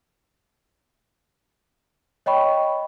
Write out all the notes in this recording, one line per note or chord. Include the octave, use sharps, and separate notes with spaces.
C#5 D#5 G5 B5 C#6